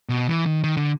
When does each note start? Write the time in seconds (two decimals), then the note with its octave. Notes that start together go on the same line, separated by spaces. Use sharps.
0.09 B2
0.28 E3
0.46 D#3
0.64 D#3
0.77 D3